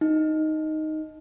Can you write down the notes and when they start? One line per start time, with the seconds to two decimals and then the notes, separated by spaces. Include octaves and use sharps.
0.01 D#4